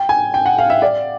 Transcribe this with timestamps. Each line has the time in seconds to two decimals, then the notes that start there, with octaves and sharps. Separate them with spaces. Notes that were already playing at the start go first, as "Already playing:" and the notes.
Already playing: G5
0.09 G#5
0.34 G5
0.46 F#5
0.58 F5
0.70 E5
0.82 D5